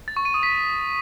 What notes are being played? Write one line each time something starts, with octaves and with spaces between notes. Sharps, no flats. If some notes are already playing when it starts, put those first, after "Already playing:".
A6
C#6
D#7
D#6
B6